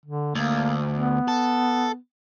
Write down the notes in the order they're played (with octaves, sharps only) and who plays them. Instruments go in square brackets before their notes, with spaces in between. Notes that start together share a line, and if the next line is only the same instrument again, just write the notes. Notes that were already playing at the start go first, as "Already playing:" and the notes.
[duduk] D3
[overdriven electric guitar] D2 [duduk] A#3
[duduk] B3
[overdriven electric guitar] A4